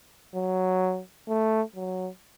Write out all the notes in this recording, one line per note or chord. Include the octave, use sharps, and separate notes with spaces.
F#3
A3
F#3